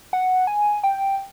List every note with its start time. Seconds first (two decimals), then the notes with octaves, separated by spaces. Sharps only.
0.13 F#5
0.47 G#5
0.83 G5